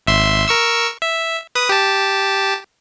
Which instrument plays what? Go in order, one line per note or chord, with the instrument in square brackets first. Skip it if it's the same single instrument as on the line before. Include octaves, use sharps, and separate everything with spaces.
[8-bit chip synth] G#1 E5 C6
A#4 C#6 E6
E5
B4 D#6
G4 A5